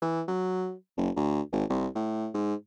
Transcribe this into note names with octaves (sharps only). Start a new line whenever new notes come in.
E3
F#3
F#1
D2
G#1
C2
A2
G#2